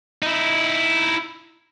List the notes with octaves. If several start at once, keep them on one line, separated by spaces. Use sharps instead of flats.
D#4 E4